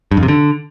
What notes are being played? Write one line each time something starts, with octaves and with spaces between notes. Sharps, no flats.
G2
F2
C3
D3